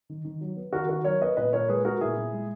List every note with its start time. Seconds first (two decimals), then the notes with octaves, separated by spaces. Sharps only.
0.09 D#3
0.25 D#3
0.41 F#3
0.57 B3
0.73 D#3 F#4 A#4
0.89 D#3 F#4 A#4
1.04 F#3 A#4 C#5
1.21 B3 B4 D#5
1.37 A#2 B4 D#5
1.53 A#2 A#4 C#5
1.68 G#3 G#4 B4
1.85 B3 F#4 A#4
2.01 A#2 E4 G#4
2.18 A#2
2.33 G#3